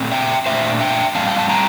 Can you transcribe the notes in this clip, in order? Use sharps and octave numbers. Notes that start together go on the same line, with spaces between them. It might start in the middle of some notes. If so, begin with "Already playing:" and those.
Already playing: A#2 A3 C4
E5 G5
A#2 A3 D4 C5 E5
E5 G5
A2 G3 C4 F5 A5
G5
A5
G5 A#5